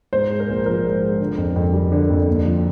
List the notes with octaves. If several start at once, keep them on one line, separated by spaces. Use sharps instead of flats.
G#2 C5
G#3
A#4
A#1
F3 A#4
G#2
G#3
D3
F2
F2
G3
D3
F2
D#2
F3